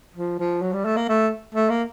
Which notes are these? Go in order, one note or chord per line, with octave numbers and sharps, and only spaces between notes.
F3
F3
F#3
G3
A3
A#3
A3
A3
A#3